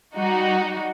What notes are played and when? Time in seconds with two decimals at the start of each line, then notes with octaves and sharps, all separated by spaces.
0.16 G3 D#4 F#4